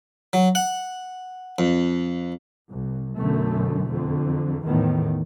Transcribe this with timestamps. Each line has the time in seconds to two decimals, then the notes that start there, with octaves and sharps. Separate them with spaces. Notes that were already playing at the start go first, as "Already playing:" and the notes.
0.33 F#3
0.55 F#5
1.59 F2
2.69 C2
3.17 B1 F#2 B2 D3 A3
3.90 F2 D3
4.64 E2 A2 D#3 B3